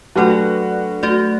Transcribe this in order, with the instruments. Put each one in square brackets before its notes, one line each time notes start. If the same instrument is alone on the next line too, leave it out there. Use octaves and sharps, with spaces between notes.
[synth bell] F#3 A3 D4 A4 D5 [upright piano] F#4 B4
[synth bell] A3 F#4 D5